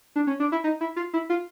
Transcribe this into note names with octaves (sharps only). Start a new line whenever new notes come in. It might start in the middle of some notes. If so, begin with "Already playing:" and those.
D4
C#4
D4
E4
D#4
E4
F4
E4
F4